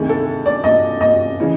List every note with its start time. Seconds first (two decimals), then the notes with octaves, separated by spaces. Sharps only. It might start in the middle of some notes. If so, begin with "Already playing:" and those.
Already playing: D2 C3 D#3 G#4
0.09 A4
0.46 D5
0.64 D#5
1.01 D#5
1.40 C#3 E3